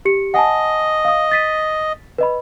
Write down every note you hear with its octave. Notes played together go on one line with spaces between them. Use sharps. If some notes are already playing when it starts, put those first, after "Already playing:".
G4 C#7
D#5 F#5 G#5 A5
F5 D#6
A6 B6 D#7
B4 D#5 B5